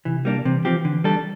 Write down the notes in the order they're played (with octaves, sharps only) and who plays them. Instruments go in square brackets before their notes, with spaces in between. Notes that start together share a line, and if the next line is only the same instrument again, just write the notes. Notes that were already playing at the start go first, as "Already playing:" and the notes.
[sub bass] C3 [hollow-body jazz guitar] E3
[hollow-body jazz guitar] G3 A#3 D4
[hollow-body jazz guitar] C3 [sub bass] E3
[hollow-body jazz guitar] F3 C4 G4
D3
G3 D4 A4